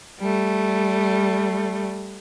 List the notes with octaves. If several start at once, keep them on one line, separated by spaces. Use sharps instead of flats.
G3 A3